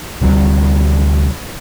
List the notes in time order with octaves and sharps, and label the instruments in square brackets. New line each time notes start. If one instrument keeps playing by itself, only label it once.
[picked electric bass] D2 C3 F#3 G3